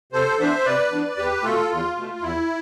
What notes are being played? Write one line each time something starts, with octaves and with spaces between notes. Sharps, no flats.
C3 A4 C5
E3 B3 D4 C5 E5
C3 B4 D5
E3 B3 D4
E2 G4 B4
B2 A3 F4 A4
E2 F4
B2 A3
E2 E4